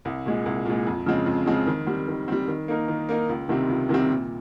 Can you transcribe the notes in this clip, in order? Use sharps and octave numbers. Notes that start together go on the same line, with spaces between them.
C2
A#2 G#3
C2
A#2 G#3
F2
C#3 F3 G#3 C4
F2
C#3 F3 G#3 C4
D#3
G3 C4
D#3
G3 C4
D#3
A#3 D#4 A#4
D#3
A#3 D#4 A#4
C#2
C3 D#3 G3 C4
C#2
C3 D#3 G3 C4
A#2